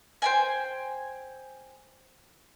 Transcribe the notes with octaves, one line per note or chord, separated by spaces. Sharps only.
C5 G5 G#5